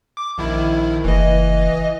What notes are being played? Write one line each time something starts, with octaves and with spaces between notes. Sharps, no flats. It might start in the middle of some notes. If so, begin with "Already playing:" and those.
D6
A#1 D#3 E4
F#1 E3 D#5